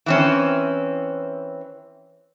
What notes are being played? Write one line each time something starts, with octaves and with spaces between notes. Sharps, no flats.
E3 C4 C#4